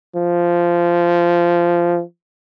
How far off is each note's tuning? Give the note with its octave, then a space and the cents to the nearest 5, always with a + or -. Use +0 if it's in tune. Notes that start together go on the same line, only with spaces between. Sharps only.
F3 -15